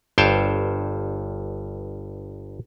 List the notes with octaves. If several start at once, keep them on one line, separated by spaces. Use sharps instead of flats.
G1 G2 C5 C#5 G5 A5